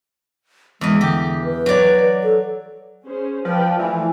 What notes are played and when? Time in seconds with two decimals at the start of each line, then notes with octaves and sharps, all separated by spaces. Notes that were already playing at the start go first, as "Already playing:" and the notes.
0.81 E2 G#3 D#5
1.01 D3 G4
1.44 B4
1.66 F#3 D5
2.23 A4
3.04 C#4 G#4 C5
3.45 F3 B4 D5 G5
3.79 E3 F3 A3 F4